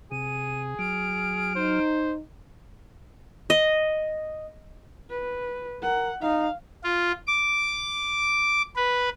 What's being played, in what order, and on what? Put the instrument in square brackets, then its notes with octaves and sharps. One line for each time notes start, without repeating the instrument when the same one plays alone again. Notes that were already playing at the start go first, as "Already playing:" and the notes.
[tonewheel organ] C3 [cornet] G#4 [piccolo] D#7
[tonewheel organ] F#3 F6 [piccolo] D7
[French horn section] D#4 [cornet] C5
[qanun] D#5
[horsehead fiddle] B4
[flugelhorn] A#4 [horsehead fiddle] F#5
[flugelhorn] D#4 [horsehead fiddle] F5
[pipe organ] F4
D6
B4